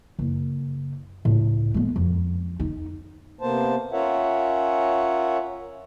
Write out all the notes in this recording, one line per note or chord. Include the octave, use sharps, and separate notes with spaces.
F#1
C#2 A2
G#3 B3
F2
D#4
C3 A#3 B3 C5 A5
C#4 F4 A#4 C#5 E5 F#5